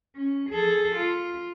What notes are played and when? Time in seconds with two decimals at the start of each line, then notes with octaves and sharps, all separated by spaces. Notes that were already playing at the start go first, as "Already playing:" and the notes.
0.16 C#4
0.50 G#4 A4
0.96 F4